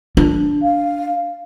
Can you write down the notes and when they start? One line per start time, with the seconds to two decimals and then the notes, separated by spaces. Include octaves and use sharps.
0.17 D4
0.62 F5